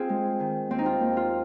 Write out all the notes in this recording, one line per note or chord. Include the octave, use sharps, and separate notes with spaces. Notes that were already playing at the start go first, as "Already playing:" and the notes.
Already playing: C4 F4 G#4
G#3
D#3
D#2 C4
D#4
F4
D#2
F4